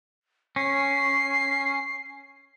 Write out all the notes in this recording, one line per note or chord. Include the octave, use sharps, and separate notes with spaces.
C#4 C7